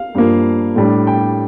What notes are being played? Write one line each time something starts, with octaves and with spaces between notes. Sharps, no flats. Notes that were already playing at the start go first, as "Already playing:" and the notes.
Already playing: F5
G2 F3 A#3
A2 G3 D4
G5